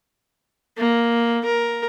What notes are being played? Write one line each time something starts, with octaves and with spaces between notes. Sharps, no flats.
A#3
A#4